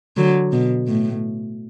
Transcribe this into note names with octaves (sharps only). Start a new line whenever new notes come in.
D3 F#3
B2
A2